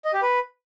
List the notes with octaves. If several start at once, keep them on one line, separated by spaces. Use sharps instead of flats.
D#5
G4
B4